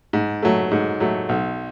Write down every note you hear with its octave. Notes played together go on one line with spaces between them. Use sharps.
G#2
F#3 A3
G#2
F#3 A3
B1